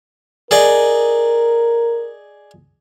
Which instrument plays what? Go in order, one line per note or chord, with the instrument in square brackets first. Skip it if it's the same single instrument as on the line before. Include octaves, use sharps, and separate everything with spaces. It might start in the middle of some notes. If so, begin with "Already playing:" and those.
[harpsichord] G#4 D5 D#5 [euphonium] A#4